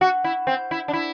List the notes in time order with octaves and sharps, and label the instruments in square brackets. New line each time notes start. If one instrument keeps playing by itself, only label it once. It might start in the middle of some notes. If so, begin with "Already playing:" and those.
[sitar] F#4 [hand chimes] F#5
[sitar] E4
C4
E4
D4
E4